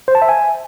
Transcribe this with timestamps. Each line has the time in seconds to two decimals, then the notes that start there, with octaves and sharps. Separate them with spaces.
0.08 C5
0.15 A5
0.22 E5
0.29 G#5